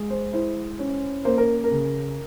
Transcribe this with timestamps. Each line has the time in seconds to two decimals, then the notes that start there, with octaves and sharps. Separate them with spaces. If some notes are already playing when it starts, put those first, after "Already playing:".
Already playing: G#3
0.10 C5
0.32 E4 C5
0.79 C#4
1.25 A#3 C5
1.38 A#4
1.64 A#4
1.71 C#3